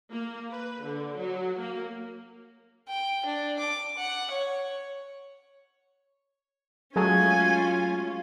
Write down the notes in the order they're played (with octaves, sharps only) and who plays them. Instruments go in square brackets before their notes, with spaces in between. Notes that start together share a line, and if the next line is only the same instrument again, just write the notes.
[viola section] A#3
B4
D3
F#3
A#3
[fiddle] G5
D4
D6
F#5
C#5
[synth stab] F#3 G#3 A3 [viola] C#4 F4 [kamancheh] G#5